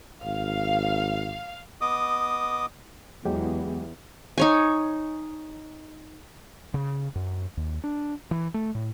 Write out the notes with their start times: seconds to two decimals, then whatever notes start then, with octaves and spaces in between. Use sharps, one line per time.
0.24 G#1 F5
1.81 B3 D#5 D6 D#6
3.25 E2 F#3 G#3 G4
4.38 D#4 C#5 G#5
6.74 C#3
7.15 F#2
7.57 D#2
7.84 D4
8.31 E3
8.54 A3
8.75 A2